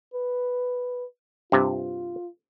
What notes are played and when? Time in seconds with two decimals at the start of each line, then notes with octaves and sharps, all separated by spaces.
0.14 B4
1.52 G2 C3 F4